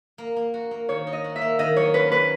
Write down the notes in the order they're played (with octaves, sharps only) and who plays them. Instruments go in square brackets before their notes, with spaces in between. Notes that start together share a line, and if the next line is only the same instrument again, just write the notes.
[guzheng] A#3
A#3
F#4
A#3
[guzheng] D#3 [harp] C#5
[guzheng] D#4
[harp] D#5
[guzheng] F#4
[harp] E5
[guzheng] A#3
[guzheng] D#3 [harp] D#5
[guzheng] F#3 [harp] C#5
[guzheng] C#4 [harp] B4
[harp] B4